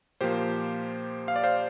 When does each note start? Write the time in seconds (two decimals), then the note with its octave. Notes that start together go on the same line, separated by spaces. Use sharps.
0.21 A#2 F3 A#3 G4 C5
1.28 F5
1.36 D5
1.44 C5 F5